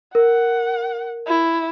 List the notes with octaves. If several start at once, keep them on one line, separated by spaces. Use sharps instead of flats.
A#4 F#5
E4